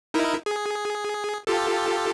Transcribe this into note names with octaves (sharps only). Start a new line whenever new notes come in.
D#4 E4 A#4
G#4
F4 G4 A4